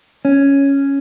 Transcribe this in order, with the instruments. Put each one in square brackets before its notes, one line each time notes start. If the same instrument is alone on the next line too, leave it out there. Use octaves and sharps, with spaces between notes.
[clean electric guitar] C#4